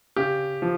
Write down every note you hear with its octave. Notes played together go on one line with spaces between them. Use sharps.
C#3 G4
F3